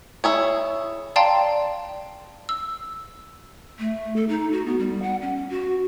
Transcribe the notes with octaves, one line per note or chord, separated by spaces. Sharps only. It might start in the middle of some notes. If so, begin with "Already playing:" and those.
E4 G#4 C#5
D5 F5 G5 A5 A#5 C6
E6
A3
A4
D#4
F#4
B3
G3
F#5
C#4
F#4